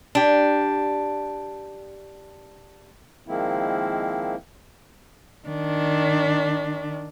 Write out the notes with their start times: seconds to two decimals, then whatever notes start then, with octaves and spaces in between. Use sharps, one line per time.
0.15 D4 G4
3.27 D#3 F3 G#3 A#3 C4 E4
5.47 D#3 D4